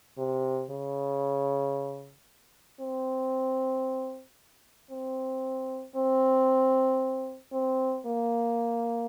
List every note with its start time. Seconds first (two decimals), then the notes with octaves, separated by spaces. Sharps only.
0.18 C3
0.71 C#3
2.80 C4
4.91 C4
5.96 C4
7.53 C4
8.06 A#3